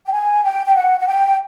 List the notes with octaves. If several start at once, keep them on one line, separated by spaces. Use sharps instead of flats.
G5
G#5
G5
G5
F#5
F#5
G5